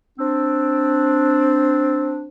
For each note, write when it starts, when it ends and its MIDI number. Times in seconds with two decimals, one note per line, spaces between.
0.19 2.27 60
0.19 2.27 62